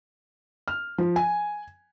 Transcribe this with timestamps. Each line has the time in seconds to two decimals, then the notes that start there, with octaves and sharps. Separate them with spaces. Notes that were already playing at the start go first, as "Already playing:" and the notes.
0.68 F6
0.98 F3
1.16 G#5